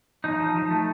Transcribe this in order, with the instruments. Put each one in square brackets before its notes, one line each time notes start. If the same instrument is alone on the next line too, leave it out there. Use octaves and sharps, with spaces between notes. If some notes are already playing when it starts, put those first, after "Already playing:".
[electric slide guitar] F3 D#4
F3
F3
A3